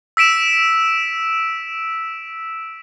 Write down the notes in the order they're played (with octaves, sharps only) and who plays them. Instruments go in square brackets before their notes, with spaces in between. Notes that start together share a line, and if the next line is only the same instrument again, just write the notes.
[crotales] E6 B6 D7 E7